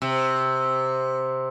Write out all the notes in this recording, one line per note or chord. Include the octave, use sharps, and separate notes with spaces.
C3